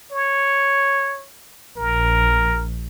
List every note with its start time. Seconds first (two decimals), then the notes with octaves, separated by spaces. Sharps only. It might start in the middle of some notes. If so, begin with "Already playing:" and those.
0.12 C#5
1.77 A#1 A#4